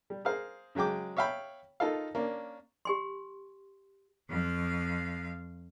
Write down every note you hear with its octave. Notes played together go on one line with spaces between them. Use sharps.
G3
G#4 A#4 C5 F5
C#3 F#3 G#3 G5 D6
C#5 E5 F5 G5 B5
D#4 F4 A4 A#4 F5
A#3 C#4 D4
G4 G#5 C6
F2 F5